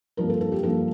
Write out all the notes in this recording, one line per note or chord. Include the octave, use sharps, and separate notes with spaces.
G2 F3 A#3 A#4
A4
A4
G4
G2 F3 A#3 A4